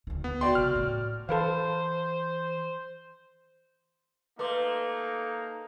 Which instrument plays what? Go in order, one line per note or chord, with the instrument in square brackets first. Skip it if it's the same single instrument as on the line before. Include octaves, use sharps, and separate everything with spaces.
[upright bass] D2 D#3
[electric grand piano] B3
[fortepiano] F#4 D5 G5 [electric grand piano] C6
[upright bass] C3 D#3 [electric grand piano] F6
[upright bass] A2
[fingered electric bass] E3 [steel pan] A4 B4 F5 [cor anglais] C5
[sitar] A3 [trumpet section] A#3 D#4 [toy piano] B4 C6 D6